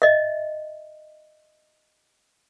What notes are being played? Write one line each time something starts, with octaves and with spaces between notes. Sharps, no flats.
D#5 E5